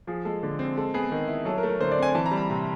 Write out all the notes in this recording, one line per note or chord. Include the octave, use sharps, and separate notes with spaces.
F3 G#4
G#3 A4
D3
C4
G#3 A4
B3 G#4
D#3
E4
F#3 A4
A#4
A3
A#4
D3 C5
D5
C4 G#5
E3 A5
A#5
G3
B5
C3